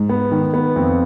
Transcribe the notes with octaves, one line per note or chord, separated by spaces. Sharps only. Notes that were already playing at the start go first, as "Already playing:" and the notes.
Already playing: G#2
B3
D#3
B3
F2